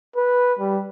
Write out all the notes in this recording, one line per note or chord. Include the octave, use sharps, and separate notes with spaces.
B4
G3